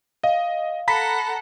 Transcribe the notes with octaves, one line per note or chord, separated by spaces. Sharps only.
D#5 F5
A4 F#5 A#5 B5 B6